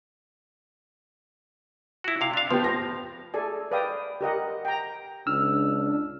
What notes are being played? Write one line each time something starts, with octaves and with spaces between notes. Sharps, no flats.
E4 F#4
C3 F5
D4 F5
F3 B3 G4
A#6
G#4 A4 D5 G#5
B4 D5 F5 G5 D#6
G4 A#4 D#5 F#5
G5 A#5
C#2 D4 E6 F6